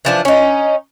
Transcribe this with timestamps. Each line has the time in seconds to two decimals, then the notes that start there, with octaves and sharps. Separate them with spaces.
0.05 E3 F3 D4
0.25 C#4 D#4